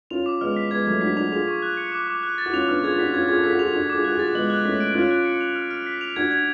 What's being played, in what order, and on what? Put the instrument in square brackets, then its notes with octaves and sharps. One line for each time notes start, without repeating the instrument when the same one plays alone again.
[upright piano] C#4 F4 [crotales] F7
[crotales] D6
[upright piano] G#3 B3 [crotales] F6
[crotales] B6
[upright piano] G#3 B3 [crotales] G#6
[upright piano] F#3 A3 [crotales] G#6
[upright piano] D4 F#4 [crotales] B6
[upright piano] D4 F#4 [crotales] F7
[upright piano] F4 G#4 [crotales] F7
[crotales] C#6
F#6
C#7
D6
D6
F#6
A6
[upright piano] F#4
[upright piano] C#4 F4 [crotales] F7
[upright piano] B3 D4 [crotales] F6
[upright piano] F4 G#4 [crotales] G#6
[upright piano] D4 F#4 [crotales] B6
[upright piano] C#4 F4 [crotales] G#6
[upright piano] F4 G#4 [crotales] G#6
[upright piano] A4
[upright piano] F4 G#4 [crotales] B6
[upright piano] F#4
[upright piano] F4 G#4 [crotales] F7
[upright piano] D4 F#4 [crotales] F7
[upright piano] F4 G#4 [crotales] D6
[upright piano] F#4 [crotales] F#6
[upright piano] F4 G#4 [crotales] A6
[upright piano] G#3 B3 [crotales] F#7
[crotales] F#6
[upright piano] A3 C#4 [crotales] B6
[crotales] D7
[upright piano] C#4 F4 [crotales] F#6
[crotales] F#6
C#7
F7
F6
F6
B6
F7
[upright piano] D4 F#4 [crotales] G#6
[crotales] G#6